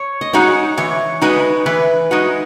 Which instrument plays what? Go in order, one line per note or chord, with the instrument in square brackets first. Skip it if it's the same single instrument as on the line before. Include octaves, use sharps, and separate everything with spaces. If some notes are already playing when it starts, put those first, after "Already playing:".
Already playing: [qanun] C#5
D#5
[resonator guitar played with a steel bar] G#3 D#4 F#4 [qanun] C#5
[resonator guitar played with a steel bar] E3 [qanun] C#5
[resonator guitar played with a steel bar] G#3 D#4 F#4 [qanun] B4
[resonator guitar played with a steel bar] E3 [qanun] B4
[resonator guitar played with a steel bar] G#3 D#4 F#4